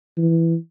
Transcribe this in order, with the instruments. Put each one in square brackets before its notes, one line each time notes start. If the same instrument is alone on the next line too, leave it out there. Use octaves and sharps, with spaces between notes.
[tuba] E3